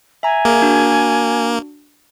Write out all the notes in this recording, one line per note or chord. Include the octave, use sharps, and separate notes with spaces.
E5 G#5 A#5
A#3 G#4 A#4
D4 F#4